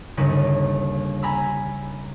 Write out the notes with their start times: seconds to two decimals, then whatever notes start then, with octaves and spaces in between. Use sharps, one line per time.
0.17 G1 D#2 C#3 A#3 D#7
1.22 G#5 A#5 B5 E6